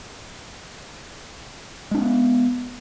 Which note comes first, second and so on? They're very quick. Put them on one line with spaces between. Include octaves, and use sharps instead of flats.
G#3 D4 C#4 B3